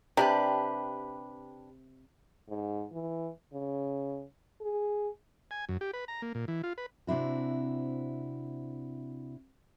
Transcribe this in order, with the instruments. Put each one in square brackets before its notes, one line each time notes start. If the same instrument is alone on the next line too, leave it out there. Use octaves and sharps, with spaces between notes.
[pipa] C3 [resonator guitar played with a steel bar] D4 G4 B4
[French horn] G#2
E3
C#3
G#4
[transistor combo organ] G#5
F#2
G4
B4
A#5
A#3
A#2
E3
F4
B4
[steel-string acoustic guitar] C3 C4 D4 E4 F#4